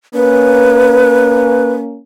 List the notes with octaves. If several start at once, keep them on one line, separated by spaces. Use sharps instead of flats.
A#3 C#4 B4